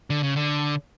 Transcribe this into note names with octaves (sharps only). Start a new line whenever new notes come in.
D3
C#3
D3